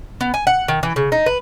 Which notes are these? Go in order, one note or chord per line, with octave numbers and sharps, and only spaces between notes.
B3
G#5
F#5
D#3
E3
C#3
D#4
B4